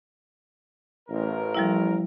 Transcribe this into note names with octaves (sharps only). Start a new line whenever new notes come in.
A1 A#4
F3 G3 E4